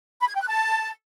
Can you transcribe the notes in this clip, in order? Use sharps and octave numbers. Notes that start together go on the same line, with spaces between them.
B5
G#6
G5
F#6
A5